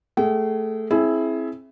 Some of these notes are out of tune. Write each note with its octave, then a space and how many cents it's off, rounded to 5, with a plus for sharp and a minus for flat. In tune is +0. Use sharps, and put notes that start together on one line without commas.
A3 +0 G#4 +0 G5 -45
C4 +25 E4 +0 G#4 +25